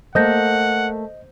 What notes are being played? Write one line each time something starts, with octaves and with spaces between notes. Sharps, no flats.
A3 A#3 C5 D#5 F#5 G6 A#6